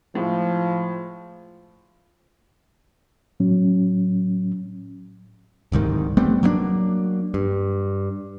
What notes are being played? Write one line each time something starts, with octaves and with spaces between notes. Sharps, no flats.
A2 F3 G#3
A2 F#3 C#4
D1 C2 G#2 D#3
G3 A3 B3 C4
F#3 A#3 B3 D4
G2